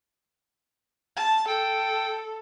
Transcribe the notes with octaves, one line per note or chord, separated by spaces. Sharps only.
A5
A4 G5